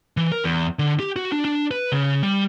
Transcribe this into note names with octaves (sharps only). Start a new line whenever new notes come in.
E3
A#4
E2
D3
G4
F#4
D4
D4
B4
C#3
G3